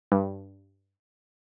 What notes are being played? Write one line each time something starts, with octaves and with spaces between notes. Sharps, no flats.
G2